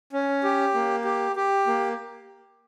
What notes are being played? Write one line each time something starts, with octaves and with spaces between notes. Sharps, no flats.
C#4
G4
A#3
G4
G4
A#3